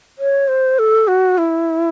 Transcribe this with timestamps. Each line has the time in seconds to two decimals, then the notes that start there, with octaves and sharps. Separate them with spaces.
0.18 C#5
0.48 C5
0.79 A4
1.08 F#4
1.38 E4